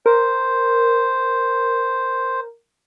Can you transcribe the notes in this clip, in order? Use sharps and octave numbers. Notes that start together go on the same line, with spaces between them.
A#4 C5